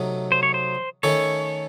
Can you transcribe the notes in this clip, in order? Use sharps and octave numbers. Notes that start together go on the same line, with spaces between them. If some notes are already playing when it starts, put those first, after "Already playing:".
Already playing: C3 F#3 A3 D#4
C5
C#5
C5
D#3 A3 C#4 A4 C#5